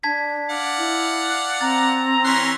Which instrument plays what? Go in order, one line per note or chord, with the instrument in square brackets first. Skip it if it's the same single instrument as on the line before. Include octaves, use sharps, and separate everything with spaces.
[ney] D4 [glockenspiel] A5 G#6 B6
[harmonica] D5 F5 F#5
[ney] E4
[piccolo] F#6
[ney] C4 [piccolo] A#5 [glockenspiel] A6
[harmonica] E3 C#4 C6 [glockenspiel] F#6 B6